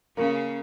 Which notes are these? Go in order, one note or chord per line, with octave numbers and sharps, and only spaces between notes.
C#3 A#3 C#4